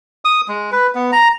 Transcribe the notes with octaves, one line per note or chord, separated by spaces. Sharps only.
D#6
G#3
B4
B3
A#5